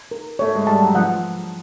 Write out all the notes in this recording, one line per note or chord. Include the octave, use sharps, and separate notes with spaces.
A#4
A3 C#5
G#3
G3 A5
F#3
F3 F#5